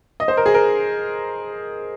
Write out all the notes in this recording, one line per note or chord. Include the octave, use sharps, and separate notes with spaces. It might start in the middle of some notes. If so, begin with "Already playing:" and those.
D#5
C5
A#4
G#4
A#4